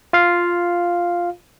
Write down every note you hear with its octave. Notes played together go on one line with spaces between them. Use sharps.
F4 F5